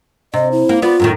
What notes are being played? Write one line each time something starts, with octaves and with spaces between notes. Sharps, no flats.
C3 D#5
E4
A#3
B3 F4 D5
F#2 A2 D#3